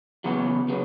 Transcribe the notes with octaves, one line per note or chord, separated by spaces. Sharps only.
E2 C#3 F#3 B3 F#5
C#3 F#3 B3